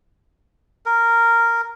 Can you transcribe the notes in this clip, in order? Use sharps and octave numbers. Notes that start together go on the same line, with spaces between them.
A#4